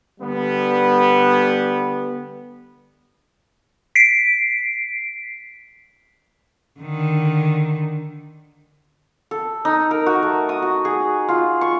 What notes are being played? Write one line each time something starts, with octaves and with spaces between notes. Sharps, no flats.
D3 G3 B3
B6 C7 D7
D3 D#3
A4
D#4
A#4
F#4
A3
D#6
F#4
G#4
F4
C#6